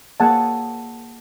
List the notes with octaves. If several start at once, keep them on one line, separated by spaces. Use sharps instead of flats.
A#3 G#4 F#5 G#5 A5